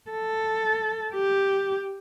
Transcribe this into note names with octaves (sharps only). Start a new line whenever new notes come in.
A4
G4